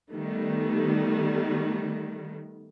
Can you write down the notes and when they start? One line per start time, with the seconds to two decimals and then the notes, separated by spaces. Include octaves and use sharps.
0.12 D#3 G3 A3 B3